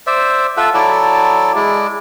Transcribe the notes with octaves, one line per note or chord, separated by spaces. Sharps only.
C5 D5 E5
F4 A4 E5 F#5
F#3 E4 A4 D5
G#3 E4 D5